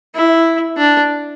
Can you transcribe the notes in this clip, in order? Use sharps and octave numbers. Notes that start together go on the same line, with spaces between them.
E4
D4